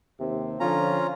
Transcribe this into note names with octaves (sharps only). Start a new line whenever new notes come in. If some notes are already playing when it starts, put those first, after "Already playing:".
D#2 C3 C4
D3 F3 C#4 F4 A#5